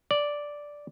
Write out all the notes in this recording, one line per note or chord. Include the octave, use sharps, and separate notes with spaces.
D5